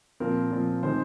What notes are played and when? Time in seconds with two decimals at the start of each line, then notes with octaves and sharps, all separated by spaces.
0.20 A#2 F3 C4 A#4
0.51 A#2 F3 C4
0.83 D#3 G#3 C4 C5